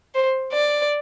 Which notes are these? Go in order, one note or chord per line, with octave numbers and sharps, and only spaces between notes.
C5
D5